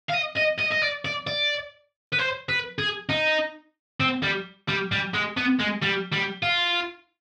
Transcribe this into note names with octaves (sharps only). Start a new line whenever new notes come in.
F5
D#5
D#5
D#5
D#5
D5
D5
D5
B4
C5
B4
G#4
D#4
C4
G3
G3
G3
G#3
B3
G#3
G3
G3
F4